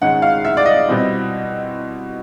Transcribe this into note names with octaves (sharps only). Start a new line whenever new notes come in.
G#2 D#3 G#3 C#4 F#5
F5
E5
D5
D#5
B2 G3 C4 E4